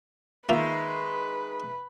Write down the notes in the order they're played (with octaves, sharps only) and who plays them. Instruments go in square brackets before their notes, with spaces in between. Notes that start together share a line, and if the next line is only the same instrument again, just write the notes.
[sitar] D#3 G#3 [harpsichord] A#3 F4 [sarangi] B4 [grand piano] E5